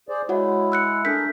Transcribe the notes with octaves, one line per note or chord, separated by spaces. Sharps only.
G#4 C5 D5
G#3 E4 F#4 C#5 F#5
E6 F#6 C#7
A3 D4 G#4 A#4 G6 B6